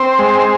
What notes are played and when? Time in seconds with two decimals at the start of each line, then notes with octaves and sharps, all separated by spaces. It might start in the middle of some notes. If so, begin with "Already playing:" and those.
Already playing: C4 C5
0.19 G#3